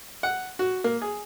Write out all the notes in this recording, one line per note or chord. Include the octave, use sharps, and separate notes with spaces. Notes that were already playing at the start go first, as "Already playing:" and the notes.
F#5
F#4
A#3
G#4